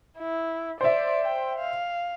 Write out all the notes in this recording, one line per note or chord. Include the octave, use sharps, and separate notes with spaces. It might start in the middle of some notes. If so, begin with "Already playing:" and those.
E4
C5 D5 E5
G5
F5